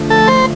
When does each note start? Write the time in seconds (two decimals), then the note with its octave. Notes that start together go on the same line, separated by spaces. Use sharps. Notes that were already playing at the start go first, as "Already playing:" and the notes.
Already playing: D3 F3 A3
0.10 A4
0.28 C5